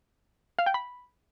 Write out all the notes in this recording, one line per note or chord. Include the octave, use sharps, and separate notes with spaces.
F5
G5
B5